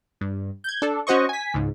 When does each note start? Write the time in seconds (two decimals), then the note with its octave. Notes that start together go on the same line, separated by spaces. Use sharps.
0.21 G2
0.64 G6 G#6
0.82 D4 A4
1.07 C#4 F#4 C5 D#5 C#6
1.29 G#5 B6
1.54 C#2 G#2